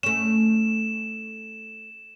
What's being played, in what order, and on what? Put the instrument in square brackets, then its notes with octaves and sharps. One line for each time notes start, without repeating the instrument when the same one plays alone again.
[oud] A3 C#4 [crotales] E7